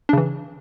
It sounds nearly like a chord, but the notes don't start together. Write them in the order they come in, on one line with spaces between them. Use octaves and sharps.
D4 C#3 E3